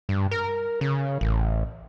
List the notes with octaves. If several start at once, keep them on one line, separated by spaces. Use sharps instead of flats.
G2
A#4
C#3
A1